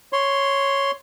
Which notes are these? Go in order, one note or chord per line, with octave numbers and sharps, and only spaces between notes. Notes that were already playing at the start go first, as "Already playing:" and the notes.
C#5 C6